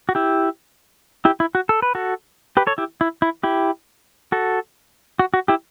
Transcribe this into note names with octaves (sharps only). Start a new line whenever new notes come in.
F#4
E4 G4
E4 G4
E4
F#4
A4
B4
F#4 A4
G4 B4
A4 C#5
E4 G4
E4
E4
E4 G4
F#4 A4
F#4
F#4
E4 G4